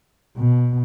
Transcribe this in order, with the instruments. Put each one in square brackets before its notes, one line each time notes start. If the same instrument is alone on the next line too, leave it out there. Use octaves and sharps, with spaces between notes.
[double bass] B2